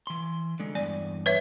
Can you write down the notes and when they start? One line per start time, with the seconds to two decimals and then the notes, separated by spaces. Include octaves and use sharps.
0.07 E3 C6
0.60 D3 G#3
0.75 E2 G2 D5 G#5
1.26 B4 C#5 E5